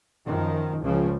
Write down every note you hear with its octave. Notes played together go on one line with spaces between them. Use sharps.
F#2 D#3 F3
C#2 C#3 F3